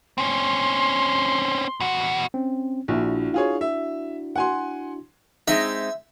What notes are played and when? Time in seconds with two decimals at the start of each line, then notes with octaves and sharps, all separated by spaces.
0.18 C4 C#4 C6
1.80 E2 F#4
2.34 C4 C#4
2.88 A#1 D4 E4 F#4
3.34 F4 G#4 C#5
3.61 E5
4.36 F#5 G#5 C6
5.48 G#3 C4 D#4 E5